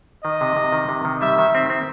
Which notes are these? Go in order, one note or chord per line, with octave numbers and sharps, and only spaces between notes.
D#3 D#5
C3
C3
D#3
C3
D#3
G3 E5
D#3
C4
C4